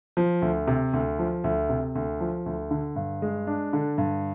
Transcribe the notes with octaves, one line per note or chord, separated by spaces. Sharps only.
F3
D2
C3
D2
F3
D2
C3
D2
F3
D2
D3
G2
G#3
D4
D3
G2